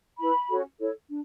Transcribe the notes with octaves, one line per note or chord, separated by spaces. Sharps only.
E4 B4 B5
C#4 F#4 A4 C#5
E4 A4 C#5
D4